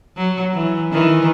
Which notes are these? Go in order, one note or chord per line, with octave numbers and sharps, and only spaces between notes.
F#3
E3
D#3 E3